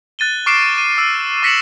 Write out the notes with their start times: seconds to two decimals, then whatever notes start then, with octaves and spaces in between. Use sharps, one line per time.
0.19 F#6 A6 D#7 G7
0.46 C#6 D6 F6 C7 D7 E7
0.78 D#7
0.98 D6 E6 D7 D#7
1.43 C#6 A#6 B6 C#7 E7 F#7